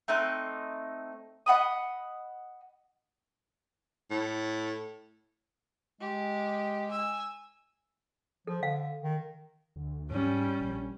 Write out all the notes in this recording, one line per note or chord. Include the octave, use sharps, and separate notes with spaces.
A3 C4 D#4 F#6
D#5 F#5 B5 D#6
A2
G#3 G4
G#5 E6
F3 A4
D3 F5
D#3
D2
G#2 G3 C#4
A#1